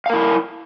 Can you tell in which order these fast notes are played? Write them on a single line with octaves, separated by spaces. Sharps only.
F5 A#4 E4